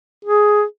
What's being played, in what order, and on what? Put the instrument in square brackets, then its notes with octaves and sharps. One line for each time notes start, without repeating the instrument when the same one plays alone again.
[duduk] G#4